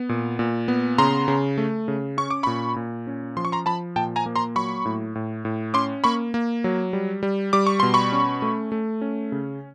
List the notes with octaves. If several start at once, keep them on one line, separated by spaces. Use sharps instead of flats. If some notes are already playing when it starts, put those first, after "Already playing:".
Already playing: B3
A#2
A#2
B3
C#3 A#5 C6
C#3
A3
C#3
C#4 C#6
D6
A#2 B5 C#6
A#2
C#4
F3 C6
C#6
A#5 C6
F3 A5 B5
A#2 G5 A5
G#5 A#5
A#3
A#5 C6
F#3 B5 C#6
A2
A2
A2
C#4 C6 D6
A#3 B5 C#6
A#3
F#3
G3
G3
G3 D6
C#6
B2 C6
B5 C#6
C#4
A3
A3
C#4
C#3